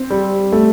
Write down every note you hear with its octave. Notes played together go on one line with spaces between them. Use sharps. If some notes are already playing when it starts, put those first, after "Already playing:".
Already playing: C4
G3
A3